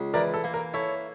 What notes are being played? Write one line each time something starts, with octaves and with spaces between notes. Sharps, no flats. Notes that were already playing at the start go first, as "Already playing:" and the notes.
Already playing: C#2
E3 A#4 D5
A4
A#3
A#4
E4 A4 C#5